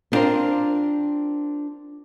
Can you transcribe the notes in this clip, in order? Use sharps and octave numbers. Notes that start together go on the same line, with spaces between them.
B3 C4 D4 F4 A#4 C5